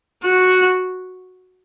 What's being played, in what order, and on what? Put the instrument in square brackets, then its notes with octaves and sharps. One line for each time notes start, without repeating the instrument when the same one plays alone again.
[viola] F#4